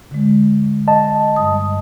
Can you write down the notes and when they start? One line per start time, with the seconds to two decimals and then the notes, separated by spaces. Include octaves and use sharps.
0.11 D3 G#3
0.88 D#5 A5
1.36 G2 G3 D#6